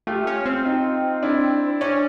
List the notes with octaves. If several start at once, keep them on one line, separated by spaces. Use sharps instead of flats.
A3 F4 G4
C#4
C4
D#4 F4
D4 E4
C#4 D4